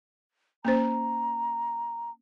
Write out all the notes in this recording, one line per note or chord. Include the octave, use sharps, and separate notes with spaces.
A#3 C#4 C5 A#5